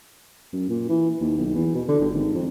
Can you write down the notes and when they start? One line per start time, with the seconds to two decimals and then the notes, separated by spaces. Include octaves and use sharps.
0.53 F#2
0.69 A#2
0.89 E3
1.21 D#2
1.38 B1
1.54 E2
1.75 B2
1.88 D3
2.00 G1
2.15 G#1
2.34 F2